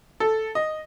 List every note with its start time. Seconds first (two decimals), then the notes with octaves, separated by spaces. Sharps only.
0.20 A4
0.55 D#5